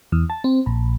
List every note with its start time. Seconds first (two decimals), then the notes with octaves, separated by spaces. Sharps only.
0.12 E2
0.30 A5
0.44 C4
0.66 A#1